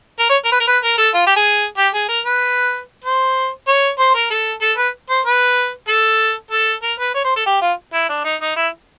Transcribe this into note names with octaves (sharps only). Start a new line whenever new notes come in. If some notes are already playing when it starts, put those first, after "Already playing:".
A#4
C#5
A#4
B4
A#4
B4
A#4
A4
F4
G4
G#4
G4
G#4
A#4
B4
C5
C#5
C5
A#4
A4
A4
B4
C5
B4
A4
A4
A#4
B4
C#5
C5
A4
G4
F4
E4
D4
D#4
D#4
E4